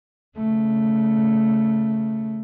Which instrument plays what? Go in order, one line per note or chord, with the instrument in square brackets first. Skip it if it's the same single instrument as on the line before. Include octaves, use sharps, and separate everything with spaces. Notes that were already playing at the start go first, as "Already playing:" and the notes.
[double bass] C#3 A3